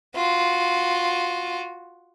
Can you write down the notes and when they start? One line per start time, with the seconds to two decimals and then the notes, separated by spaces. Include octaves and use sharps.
0.15 F4 F#4